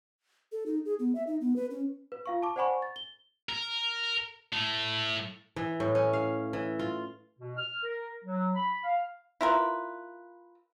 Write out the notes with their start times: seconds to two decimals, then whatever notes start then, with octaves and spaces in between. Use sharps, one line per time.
0.52 A4
0.66 D#4
0.85 G#4
0.99 B3
1.15 E5
1.27 D#4
1.41 B3
1.56 B4
1.71 C#4
2.12 B4
2.26 F4 F5 C#6
2.43 A5 D6
2.56 C5 D5 F#5 G#5 B5 C#6
2.82 A6
2.96 G7
3.49 A#4
4.53 A2 A3
5.56 E3
5.80 A2
5.95 C#4
6.13 F5
6.53 E3
6.79 F4
7.39 B2
7.57 F6
7.83 A#4
8.25 F#3
8.55 B5
8.84 F5
9.41 E4 F4 A#4 B4